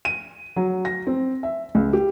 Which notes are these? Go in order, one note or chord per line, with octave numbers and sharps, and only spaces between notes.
D#7
F#3
A#6
C4
E5
C#2
G4